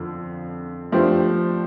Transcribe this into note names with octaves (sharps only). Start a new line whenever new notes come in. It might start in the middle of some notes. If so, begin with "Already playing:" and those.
Already playing: F2 D3 F3
F3 A3 D4 G4 C5